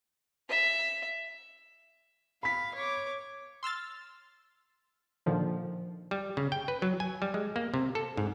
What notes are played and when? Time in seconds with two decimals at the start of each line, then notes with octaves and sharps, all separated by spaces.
0.49 E5
2.43 F5 B5 B6
2.75 C#5 D6
3.63 C6 E6 F6 A6
5.26 A#2 D3 D#3 F3
6.11 G3
6.37 C#3
6.52 G5
6.68 B4
6.82 F#3
7.00 G#5
7.22 G3
7.34 G#3
7.56 A#3
7.74 C3
7.95 A4
8.17 G#2